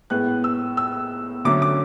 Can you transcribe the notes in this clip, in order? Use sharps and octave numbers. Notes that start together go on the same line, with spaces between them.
A2 G#3 B3 F#6
E6
E6
D3 F#3 A3 C#4 D6
D6